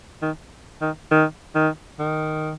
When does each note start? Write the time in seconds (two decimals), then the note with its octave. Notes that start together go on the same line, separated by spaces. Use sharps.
0.22 D#3
0.81 D#3
1.11 D#3
1.55 D#3
1.99 D#3